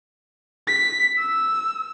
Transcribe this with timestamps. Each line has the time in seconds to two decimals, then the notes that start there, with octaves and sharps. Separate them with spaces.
0.67 B6
1.18 E6